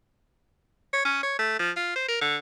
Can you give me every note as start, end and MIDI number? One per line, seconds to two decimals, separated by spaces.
0.93 1.03 73
1.05 1.21 61
1.23 1.35 73
1.39 1.56 57
1.59 1.71 53
1.76 1.93 65
1.96 2.06 72
2.08 2.18 70
2.21 2.38 50